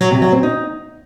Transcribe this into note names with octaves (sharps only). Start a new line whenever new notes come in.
F#3
C3
F#3
C4
D#4